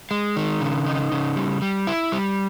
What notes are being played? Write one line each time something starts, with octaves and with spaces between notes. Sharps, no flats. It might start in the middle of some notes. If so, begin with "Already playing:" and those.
G#3
D#3
C#3
D#4
C#3
G3
G3
E4
G3